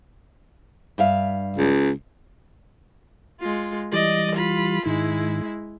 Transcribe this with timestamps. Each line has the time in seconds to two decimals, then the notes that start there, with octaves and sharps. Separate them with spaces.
0.98 G2 E5 F5
1.57 C#2
3.41 G#3 F4
3.93 E3 G3 D5 D#5
4.36 F4 B5
4.86 G#2 D#3 G#3 E4